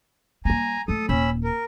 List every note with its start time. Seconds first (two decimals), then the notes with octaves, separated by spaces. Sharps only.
0.45 G3 A#3 G#5 A#5
0.88 F#3 A3 A4 D#6
1.09 D#1 C#4 B5 E6
1.44 A#4